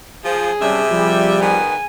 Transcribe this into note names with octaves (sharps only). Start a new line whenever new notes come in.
F3 G#4
C3 G3 C#4 D4 E5
F3 G3
D#3 B3 G#5